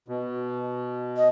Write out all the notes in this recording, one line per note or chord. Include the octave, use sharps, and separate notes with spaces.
B2
D#5